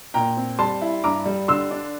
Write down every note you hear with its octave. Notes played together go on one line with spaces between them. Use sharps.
A#2 G5 A#5
C4
G3 A5 C6
E4
G2 A#5 D6
G3
D3 C6 E6
D4